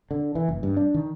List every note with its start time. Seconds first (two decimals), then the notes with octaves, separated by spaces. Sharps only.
0.11 D3
0.35 E3
0.49 F#1
0.63 G2
0.77 D4
0.94 D#3